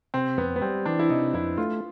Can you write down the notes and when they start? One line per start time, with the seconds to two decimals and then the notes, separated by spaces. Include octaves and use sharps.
0.14 C3 C4
0.37 F2 B3
0.56 B3
0.62 G3 C4
0.86 E3 D4
0.99 E4
1.10 C3 D#4
1.33 F2 E4
1.57 A3 F4